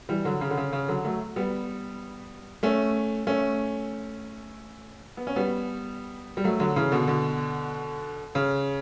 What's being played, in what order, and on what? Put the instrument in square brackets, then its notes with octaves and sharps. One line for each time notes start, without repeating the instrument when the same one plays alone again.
[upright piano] E3 G3
D3 F#3
C#3
D3
C#3
C#3
D3 F#3
F#3 A3
G3 B3
A3 C#4
A3 C#4
B3
C#4
G3 B3
G3
F#3 A3
D3 F#3
C#3 E3
B2 D3
B2 D3
C#3